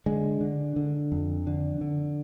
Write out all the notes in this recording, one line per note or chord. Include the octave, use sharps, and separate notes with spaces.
D3 G#3
D3
D3
F2
D3
D3